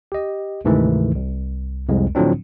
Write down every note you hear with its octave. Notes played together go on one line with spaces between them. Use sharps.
G4 D#5
D2 G#2 C3 D#3 E3 A3
C2
C2 F2 G#3
A2 D3 F3 F#3 C4 D4